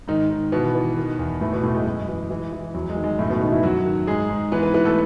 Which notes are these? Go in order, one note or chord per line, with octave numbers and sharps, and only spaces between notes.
G#2 D#3 D#4
D#3
B2 E3 B3
E3
D#3
E2
A2 E3 A3
B2 B3
A2 A3
G#3
F#2 G#3
E3
E3
E3
E2 F#3
G#3
D#3
G#3
F#2 A2 A3
B2 B3
F#2 D#3 D#4
E3 E4
F#2 F#3 F#4
D#3
G#2 G#3 G#4
G#2
E3 B3 B4
B3 B4
E3 B3 B4
A3 A4